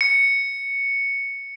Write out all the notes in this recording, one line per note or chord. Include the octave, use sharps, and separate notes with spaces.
C#7